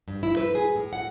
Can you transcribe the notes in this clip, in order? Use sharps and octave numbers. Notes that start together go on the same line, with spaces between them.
G2
E4
B4
G#4
A2
F#5